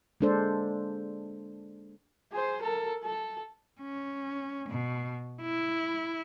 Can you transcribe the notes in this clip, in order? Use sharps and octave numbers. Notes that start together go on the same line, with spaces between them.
G#3 A#3 D4 A4 C5
G#4 C5
A4 A#4
A4
C#4
B2
E4